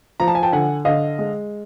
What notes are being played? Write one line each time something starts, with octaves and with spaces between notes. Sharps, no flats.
F3 A#5
A5
G#5
G5 A5
D3 F#5 G#5
D3 D#5 F5
G#3